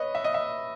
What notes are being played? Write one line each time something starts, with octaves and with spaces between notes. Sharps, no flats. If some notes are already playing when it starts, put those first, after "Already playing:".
Already playing: B4 C#5 D#5
E5
D#5
E5